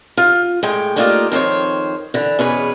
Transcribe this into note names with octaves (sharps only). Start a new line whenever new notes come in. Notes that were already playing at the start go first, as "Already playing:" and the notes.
F4
A2 G#3 G5 G#5
A3 A#3 D4 D#4 F4 G4
F2 D#3 C5 C#5
D3 E3
E2 B2 C#4 G#4 B4 G#5